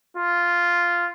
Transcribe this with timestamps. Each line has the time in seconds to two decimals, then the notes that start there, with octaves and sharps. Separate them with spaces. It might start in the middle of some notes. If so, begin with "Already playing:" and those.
0.17 F4